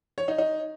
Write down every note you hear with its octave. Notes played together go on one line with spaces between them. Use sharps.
C#5
D#4
D#4